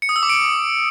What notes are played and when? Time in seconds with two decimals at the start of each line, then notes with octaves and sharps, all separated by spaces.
0.02 C#7
0.09 D#6
0.16 E6
0.23 D6
0.29 D7